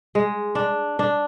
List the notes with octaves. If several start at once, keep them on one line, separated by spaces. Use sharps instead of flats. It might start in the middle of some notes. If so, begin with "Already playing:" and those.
G#3
D4
D4